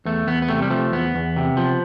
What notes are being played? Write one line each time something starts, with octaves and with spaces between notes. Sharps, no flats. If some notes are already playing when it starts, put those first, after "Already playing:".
E2 A3
E2 B3
B3
C3 A3
G3
F3 A3
E2 B3
E2
C3
F3